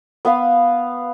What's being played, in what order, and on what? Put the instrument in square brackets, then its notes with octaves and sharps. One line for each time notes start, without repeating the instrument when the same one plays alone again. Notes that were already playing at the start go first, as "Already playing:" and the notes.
[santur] B3 B4 F5